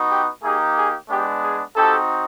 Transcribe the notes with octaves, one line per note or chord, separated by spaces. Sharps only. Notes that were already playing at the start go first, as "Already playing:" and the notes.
Already playing: B3 D#4 F#4
G4
A#3 D#4 G4 G#4
G#4
G#3 B3 D4 G4
G#4
C4 D#4 F#4 G4 A4